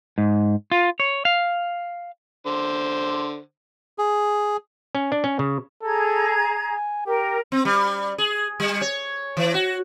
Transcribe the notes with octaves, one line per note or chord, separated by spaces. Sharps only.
G#2
F4
C#5
F5
D3 C5
G#4
C#4
D4
C#4
C#3
G#4 A4 A#5 G#6
G#5
G4 A#4
C4
G3
G#4
G3
C#5
E3
F#4